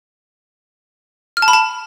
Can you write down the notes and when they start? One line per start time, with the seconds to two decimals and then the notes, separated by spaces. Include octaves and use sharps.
1.37 F6
1.42 A5
1.48 B5
1.53 A5